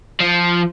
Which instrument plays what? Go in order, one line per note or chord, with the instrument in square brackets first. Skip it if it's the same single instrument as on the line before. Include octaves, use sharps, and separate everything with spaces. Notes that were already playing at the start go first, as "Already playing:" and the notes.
[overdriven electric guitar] F3